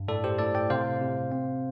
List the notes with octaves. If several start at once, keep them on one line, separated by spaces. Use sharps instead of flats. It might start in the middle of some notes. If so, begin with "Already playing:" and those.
Already playing: G2
A2 A4 D5
G4 C5
A2 A4 D5
D5 G5
C3 C5 F5
C3
C4